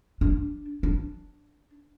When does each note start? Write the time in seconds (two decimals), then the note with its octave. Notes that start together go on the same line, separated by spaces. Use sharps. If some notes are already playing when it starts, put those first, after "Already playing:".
0.21 D4
0.83 D4